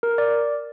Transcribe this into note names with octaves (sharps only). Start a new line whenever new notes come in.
A#4
D5